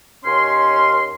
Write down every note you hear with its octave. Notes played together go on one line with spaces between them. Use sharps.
D#2 C#4 C6